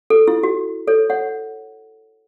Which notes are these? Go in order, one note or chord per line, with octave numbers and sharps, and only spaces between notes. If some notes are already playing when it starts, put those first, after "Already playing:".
A4
E4
F#4
A4 C#5
C#5 F#5